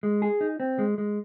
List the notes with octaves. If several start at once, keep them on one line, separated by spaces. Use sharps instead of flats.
G#3
G#4
D#4
C4
G#3
G#3